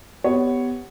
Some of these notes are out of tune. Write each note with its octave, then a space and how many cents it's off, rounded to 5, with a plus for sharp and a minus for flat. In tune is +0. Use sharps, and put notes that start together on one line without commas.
B3 +10 G4 +0 C#5 +0